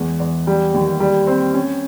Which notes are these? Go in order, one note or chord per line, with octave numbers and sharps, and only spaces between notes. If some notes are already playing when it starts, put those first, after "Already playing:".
Already playing: E2 G#3
E2
G3
D#2
G3
C4
C#4